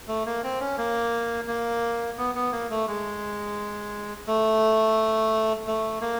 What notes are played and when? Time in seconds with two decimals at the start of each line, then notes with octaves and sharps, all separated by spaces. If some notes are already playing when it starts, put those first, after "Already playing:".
0.08 A3
0.26 A#3
0.43 C4
0.60 C#4
0.78 A#3
1.47 A#3
2.18 B3
2.35 B3
2.52 A#3
2.70 A3
2.88 G#3
4.27 A3
5.67 A3
6.01 A#3